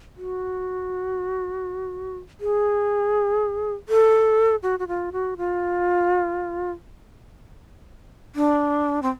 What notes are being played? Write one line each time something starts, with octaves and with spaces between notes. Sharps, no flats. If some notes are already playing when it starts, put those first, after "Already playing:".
F#4
G#4
A4
F#4
F#4
F4
F#4
F4
D4
C4